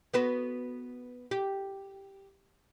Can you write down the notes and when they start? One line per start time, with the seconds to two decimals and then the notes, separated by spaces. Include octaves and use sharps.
0.14 B3 F#4 B4
1.31 G4